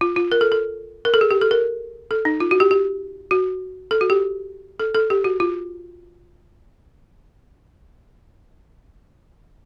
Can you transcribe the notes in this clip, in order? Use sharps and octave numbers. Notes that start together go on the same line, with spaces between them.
F4
F4
A#4
A4
A4
A#4
A4
G#4
G4
A4
A#4
A4
D#4
F4
F#4
G4
G4
F#4
A4
F#4
G4
A4
A4
G4
F#4
F4